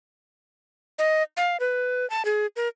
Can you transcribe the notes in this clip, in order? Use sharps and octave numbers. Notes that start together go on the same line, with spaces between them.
D#5
F5
B4
A5
G#4
A#4